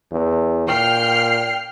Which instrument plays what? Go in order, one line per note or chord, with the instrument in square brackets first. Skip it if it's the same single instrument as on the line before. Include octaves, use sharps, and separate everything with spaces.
[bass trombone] E2
[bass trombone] A#2 [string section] G5 F6 C7